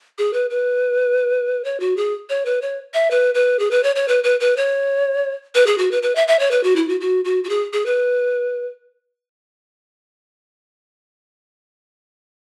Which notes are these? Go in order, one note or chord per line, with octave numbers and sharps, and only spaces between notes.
G#4
B4
B4
C#5
F#4
G#4
C#5
B4
C#5
E5
B4
B4
G#4
B4
C#5
C#5
B4
B4
B4
C#5
B4
G#4
F#4
B4
B4
E5
E5
C#5
B4
F#4
E4
F#4
F#4
F#4
F#4
G#4
G#4
B4